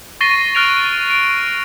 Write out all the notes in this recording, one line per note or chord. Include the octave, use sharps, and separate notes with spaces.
C#6 A6 A#6 C7 D#7 G7
F6 F#6 A6 D7 F7
D7